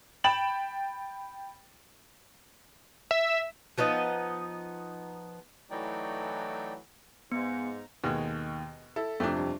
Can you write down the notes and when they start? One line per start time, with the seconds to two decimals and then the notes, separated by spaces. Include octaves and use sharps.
0.24 G5 B5 A6 E7 F#7
3.11 E5
3.78 F3 B3 D#4 D#5
5.70 E3 F#3 A3 D#4 D5 G5
7.32 G#2 B3 A#5 C#7
8.04 D#2 B2 G#3
8.96 E4 A4
9.20 F2 C3 A3 D4
9.36 G2